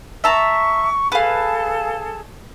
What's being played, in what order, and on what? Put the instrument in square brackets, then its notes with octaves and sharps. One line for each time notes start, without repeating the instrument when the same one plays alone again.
[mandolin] E5 A5 A#5 [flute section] C#6
[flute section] G#4 A4 A5 [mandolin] B4 F5